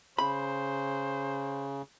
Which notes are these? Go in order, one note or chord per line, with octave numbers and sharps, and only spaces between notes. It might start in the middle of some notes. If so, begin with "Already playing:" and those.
C#3 C5 B5